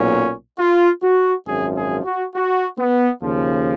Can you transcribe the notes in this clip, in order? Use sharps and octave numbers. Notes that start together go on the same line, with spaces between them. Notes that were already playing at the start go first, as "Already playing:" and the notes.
Already playing: B1 A#2 F#3 C#4
F4
F#4
G#1 F#2 F3 G#4
G#4
F#4
F#4
B3
D#2 C#3 F3